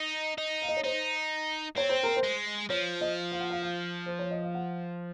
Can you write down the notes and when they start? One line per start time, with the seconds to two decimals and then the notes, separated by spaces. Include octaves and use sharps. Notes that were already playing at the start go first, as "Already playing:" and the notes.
Already playing: D#4
0.38 D#4
0.62 F5
0.69 D#5
0.77 C#5
0.84 D#4 C5
1.77 C4 C#5
1.89 C5
2.03 A#4
2.16 C5
2.23 G#3
2.70 F3 C#5
3.01 D#5
3.32 F5
3.40 F#5
3.50 F5
3.62 F5
4.06 C5
4.19 C#5
4.31 D#5
4.43 F5
4.55 F#5